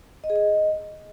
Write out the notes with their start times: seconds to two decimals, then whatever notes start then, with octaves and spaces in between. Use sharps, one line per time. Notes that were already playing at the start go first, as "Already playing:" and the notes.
0.24 D#5
0.30 G#4
0.36 D#5